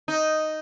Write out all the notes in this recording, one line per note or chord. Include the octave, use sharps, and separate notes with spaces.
D#4